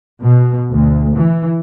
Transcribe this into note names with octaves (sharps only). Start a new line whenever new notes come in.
B2
D2
E3